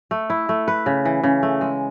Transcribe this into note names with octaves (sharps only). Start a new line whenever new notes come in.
A3
E4
A3
B4
C#3
E3
C#3
A3
G#3